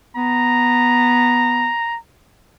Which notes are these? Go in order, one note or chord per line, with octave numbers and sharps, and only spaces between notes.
B3 A#5